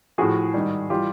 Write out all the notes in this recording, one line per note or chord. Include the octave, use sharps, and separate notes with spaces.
A2 F3 F#4 G#4
G#2 D#3 G3
E3 G3 F4 G4